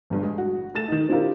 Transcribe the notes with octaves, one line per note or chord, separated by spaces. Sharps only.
G1 G2
G#3
F#4
A3 A4 A6 E7
D#3 D#4
C4 D4 E4 F4 G4 A#4